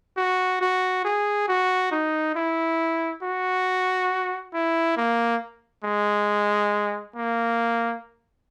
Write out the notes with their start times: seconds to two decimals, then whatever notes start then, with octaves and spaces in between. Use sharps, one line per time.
0.17 F#4
0.61 F#4
1.05 G#4
1.48 F#4
1.92 D#4
2.36 E4
3.22 F#4
4.54 E4
4.97 A#3
5.84 G#3
7.16 A#3